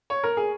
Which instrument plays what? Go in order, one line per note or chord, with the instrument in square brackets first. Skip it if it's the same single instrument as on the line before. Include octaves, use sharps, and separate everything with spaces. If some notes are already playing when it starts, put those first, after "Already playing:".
[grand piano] C#5
A#4
G#4